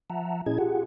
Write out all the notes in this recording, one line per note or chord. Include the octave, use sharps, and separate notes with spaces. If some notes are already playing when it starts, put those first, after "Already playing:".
F3 E5 F#5 A5 A#5
A#2 C#4 E4 G#4 D#5 G#6
F4 G4 G#4 F#5